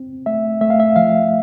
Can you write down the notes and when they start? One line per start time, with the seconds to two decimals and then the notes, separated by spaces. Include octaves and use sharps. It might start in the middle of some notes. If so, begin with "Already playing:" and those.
Already playing: C4
0.26 A3 E5
0.61 A3 E5
0.70 F5
0.80 E5
0.96 F3 F5